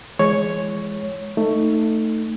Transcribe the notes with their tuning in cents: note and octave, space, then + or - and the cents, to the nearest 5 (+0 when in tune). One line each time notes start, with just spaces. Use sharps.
E3 +30 G#3 +0 C#5 +0
A3 +20 D#4 -5